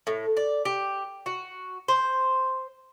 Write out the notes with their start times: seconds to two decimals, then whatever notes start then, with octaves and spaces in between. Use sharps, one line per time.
0.07 A2
0.37 D5
0.65 G4
1.26 F#4
1.88 C5